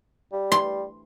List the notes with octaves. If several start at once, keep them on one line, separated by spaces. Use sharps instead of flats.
G3
C6